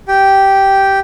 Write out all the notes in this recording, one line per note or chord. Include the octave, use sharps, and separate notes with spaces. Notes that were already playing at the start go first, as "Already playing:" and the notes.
G4 G5